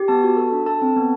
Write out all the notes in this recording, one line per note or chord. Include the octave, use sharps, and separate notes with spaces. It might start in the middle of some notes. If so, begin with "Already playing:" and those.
Already playing: G4
B3 A5
F#4
A4
D4
A4 A5
C4
B3